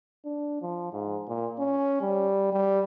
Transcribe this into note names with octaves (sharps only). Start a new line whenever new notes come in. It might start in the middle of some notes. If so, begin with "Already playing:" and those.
D4
F3
G#2
A#2
C#4
G3
G3